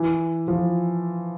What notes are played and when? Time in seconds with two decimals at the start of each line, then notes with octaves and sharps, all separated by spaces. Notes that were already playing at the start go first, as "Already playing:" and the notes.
Already playing: E3
0.48 F3